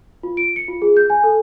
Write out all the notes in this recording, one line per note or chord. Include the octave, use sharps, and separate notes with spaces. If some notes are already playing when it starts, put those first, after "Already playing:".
F4
D7
C#7
F4
G#4
G6
G#5
A4